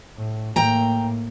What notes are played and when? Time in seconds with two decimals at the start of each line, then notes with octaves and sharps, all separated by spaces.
0.17 A2
0.56 A2 A#3 G5 A#5